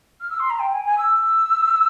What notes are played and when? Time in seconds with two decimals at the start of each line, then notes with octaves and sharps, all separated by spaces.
0.20 F6
0.30 E6
0.39 C6
0.49 A#5
0.59 G5
0.72 G#5
0.85 G#5
0.97 E6